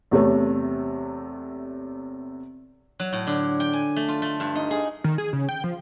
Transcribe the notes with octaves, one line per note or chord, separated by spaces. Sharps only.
E2 C3 A3 C#5
F#3
A2
D3
G5
G#5
A3
F4
A3
G2
D#4
G#4
D#3
G#4
C#3
G5
F3